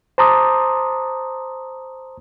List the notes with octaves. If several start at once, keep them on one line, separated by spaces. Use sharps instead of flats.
C5 A5 A#5 C6 D6 D#6